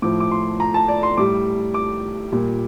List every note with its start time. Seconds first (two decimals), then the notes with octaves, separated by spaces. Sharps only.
0.02 A2 F3 D6
0.20 D6
0.31 C6
0.60 A#5
0.74 A5
0.88 D5
1.03 C6
1.17 A2 G3 D6
1.74 D6
2.32 A#2 G3